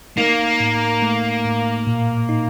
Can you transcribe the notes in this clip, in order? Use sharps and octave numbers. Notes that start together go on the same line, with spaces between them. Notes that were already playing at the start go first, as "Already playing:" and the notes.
A#3 D#4
A2
A3
A2
A#2
D#4